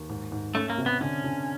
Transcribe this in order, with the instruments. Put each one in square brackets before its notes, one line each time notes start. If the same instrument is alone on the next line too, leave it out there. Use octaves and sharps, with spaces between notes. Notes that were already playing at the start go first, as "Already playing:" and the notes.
Already playing: [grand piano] D#2
G#2
G#2
[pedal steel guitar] A3 [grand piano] C#4
[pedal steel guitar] A#3
[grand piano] C3
[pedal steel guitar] B3
[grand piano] D3 [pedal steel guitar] C#4
[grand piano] D3